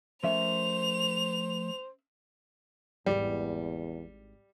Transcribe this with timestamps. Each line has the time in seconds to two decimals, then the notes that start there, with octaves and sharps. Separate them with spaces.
0.23 F3 A3 C#4 A#4 C5 E5 F7
3.06 G#1 E2 G3 E4